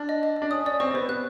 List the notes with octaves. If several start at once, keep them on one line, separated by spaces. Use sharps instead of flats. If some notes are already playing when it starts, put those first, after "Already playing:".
Already playing: D4 F6
D#5
D#5
D#5
D4
C#4 D#6
C#4 D5
C4 C#6
C4
B3 C5
B3 F#6